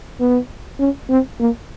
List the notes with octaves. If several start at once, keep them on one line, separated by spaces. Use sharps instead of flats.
B3
C#4
C4
A#3